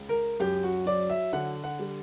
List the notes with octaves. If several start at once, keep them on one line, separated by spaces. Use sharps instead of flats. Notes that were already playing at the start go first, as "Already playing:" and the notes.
Already playing: C#2
A#4
F#2 G4
F#4
F#3 D5
E5
D3 F#5
F#5
G3